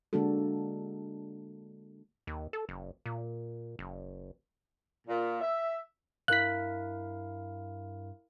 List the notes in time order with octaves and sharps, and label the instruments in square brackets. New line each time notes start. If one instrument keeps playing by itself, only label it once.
[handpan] D3 G#3 A#3 D4 F#4 A4
[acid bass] D#2
A4
F#1
A#2
F#1
[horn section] A#2
E5
[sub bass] G2 [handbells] E4 A#4 F5 [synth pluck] F#6 B6